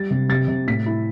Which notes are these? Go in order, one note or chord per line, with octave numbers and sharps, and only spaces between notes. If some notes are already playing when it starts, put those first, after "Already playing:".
Already playing: G3 A6
C3
C3 A6
C3
A2 B6
E4